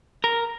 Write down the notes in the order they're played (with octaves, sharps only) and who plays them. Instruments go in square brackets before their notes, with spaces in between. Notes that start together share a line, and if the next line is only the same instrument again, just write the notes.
[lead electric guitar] A#4